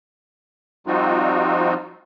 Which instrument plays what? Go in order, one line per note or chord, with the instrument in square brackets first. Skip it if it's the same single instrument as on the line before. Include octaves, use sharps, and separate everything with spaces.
[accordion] F3 G3 C4 D#4 F4 F#4